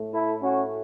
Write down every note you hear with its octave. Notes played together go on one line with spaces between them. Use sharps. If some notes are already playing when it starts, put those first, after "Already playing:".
Already playing: A2 A3
E4 A4
C#4 F#4